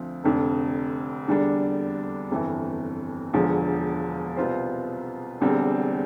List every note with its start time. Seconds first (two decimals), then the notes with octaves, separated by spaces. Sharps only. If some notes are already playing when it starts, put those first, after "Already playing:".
Already playing: D2 F3 C4
0.24 F1 F2 D3
1.28 E2 D3 G3 D4
2.31 G1 F2 E3
3.33 E1 E2 D3 F3
4.37 C2 B2 B3 F4 C5
5.40 E1 E2 D3 G3 C4